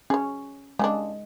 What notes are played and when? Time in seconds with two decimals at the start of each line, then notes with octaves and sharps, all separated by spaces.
0.10 C#4 G#4 C#5
0.79 C#3 G3 G#3 D4